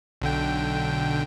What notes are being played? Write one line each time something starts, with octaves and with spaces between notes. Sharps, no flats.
B1 D3 G5